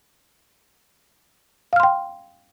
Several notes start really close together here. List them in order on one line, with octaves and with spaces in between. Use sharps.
F5 F6 C6 G5